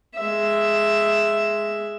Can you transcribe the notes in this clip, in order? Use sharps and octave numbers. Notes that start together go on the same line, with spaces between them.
G#3 E5